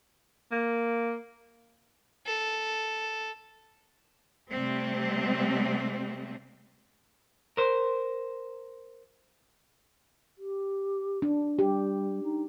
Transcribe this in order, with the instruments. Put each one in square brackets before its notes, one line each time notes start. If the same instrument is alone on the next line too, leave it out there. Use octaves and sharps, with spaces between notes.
[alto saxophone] A#3
[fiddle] A4
[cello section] C3 G3 A3 C4
[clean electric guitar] A#4 C5
[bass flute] G4
[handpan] D4
[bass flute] G3 [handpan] G4
[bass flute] D#4